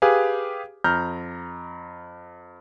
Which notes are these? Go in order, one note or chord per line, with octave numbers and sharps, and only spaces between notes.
G4 G#4 B4 F5 G#5
F2 A#5 F6 G6